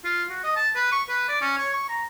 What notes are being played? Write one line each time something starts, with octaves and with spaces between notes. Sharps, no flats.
F4
F#4
D#5
A5
B4
C#6
B4
D5
C#4
C#5
C#6
A#5